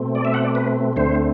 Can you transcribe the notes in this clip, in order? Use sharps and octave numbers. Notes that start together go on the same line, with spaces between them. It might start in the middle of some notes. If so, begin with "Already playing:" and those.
Already playing: B2 A3 C4
D5
E5
F#5
D5
B4
D2 D3 A3 C4 C5